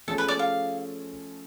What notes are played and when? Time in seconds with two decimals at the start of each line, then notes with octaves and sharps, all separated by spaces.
0.08 F3 A3 C#4 G#4 A4
0.18 B4
0.28 D5
0.39 F5